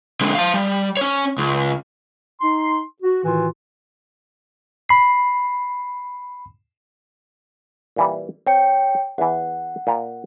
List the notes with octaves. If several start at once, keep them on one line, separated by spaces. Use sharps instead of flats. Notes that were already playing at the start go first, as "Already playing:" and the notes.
D3 G#3
F5 A5
G3
C#4 C#5
C#2
D#4 C6
F#4
A2 D#3 E3 F4 F#4
B5 C7
A#2 E3 G3
C4 C#5 G5 C#7
E2 E3 F#5
A#2 G5 A#5